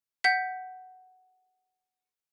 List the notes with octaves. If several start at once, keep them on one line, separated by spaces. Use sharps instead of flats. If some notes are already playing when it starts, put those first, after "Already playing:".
F#5 G6 B6